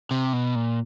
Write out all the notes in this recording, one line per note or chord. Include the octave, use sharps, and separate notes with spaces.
C3
B2
A#2